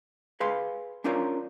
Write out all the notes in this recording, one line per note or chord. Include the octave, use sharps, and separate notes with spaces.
G#4 B4 F5 C6
C#4 D4 F4 A#4 C5 C#5